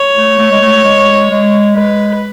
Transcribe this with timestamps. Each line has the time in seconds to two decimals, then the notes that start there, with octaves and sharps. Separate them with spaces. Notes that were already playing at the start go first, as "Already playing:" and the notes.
Already playing: C#5
0.16 A3
0.39 A3
0.51 G#3
0.61 A3
0.84 G#3
1.30 G#3
1.76 G#3 B4